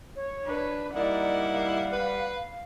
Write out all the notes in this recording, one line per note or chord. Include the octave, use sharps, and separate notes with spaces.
C#5
D4 B4
G3 A#3 D#4 E4 D5 F#5
F5
B4